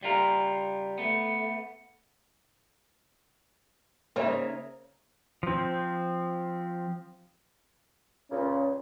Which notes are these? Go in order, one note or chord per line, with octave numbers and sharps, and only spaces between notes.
C#2 G3 F4 A#4
A3 B3
C#3 A#3 C4 D#4 C#5 E5
F3 C4
C#2 A#2 C#3 C#4